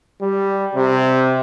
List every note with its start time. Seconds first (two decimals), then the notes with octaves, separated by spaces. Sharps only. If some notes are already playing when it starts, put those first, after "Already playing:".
0.21 G3
0.75 C3